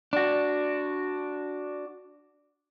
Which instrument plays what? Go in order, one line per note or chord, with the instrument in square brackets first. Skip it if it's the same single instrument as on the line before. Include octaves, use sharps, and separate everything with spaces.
[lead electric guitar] D4 F#4